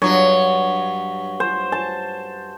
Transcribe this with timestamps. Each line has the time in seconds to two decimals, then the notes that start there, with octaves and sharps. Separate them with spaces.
0.02 G2 F#3 C#5
1.40 C5
1.72 A5